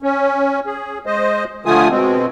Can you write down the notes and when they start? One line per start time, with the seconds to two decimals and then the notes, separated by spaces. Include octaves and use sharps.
0.03 C#4
0.66 G#4
1.06 G#3 C5 D#5
1.66 D3 F3 A3 F4 G#5 D#6
1.90 B2 G#3 C4